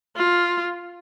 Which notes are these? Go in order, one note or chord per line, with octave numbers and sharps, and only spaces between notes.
F4